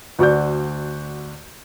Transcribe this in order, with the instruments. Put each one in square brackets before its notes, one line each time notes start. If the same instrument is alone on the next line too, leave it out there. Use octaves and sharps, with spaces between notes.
[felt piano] D2 F#4 D5 G6